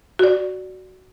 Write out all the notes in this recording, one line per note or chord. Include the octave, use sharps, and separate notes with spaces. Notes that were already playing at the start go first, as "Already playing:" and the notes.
F#4 D5